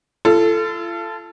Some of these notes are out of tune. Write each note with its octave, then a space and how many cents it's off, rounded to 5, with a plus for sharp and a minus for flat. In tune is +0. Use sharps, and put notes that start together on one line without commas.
F4 -40 A4 +0